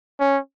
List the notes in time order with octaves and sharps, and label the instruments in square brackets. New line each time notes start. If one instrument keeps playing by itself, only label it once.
[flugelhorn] C#4